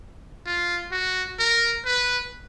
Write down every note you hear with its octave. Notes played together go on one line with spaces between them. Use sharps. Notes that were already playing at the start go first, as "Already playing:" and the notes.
F4
F#4
A#4
B4